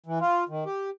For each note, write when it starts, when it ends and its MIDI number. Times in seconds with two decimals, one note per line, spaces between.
0.06 0.19 52
0.21 0.44 65
0.49 0.64 51
0.66 0.90 67